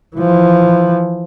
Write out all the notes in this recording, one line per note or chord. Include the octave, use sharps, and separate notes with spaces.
E3 F3